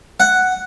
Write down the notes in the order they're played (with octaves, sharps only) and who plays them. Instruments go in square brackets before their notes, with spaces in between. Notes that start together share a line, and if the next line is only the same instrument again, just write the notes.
[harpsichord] F#5